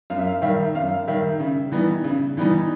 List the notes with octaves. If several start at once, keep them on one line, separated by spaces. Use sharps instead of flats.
F#2 F5
E5
F5
D#3 G3 E5
F#2 F5
D#3 G3 E5
C#3
E3 G3 B3 D#4
C#3
E3 G3 B3 D#4